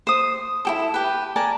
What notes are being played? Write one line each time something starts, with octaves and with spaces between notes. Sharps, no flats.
C5 D#6
E4 G4 A4
G4 B4
A#4 D5 G#5 A5